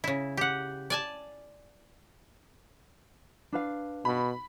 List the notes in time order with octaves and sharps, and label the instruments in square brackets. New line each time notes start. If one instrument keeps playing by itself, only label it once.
[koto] C#3 E4
G4 F#5
D5 G#5 A5
[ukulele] D4 B4 F5
[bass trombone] B2 [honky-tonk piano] B5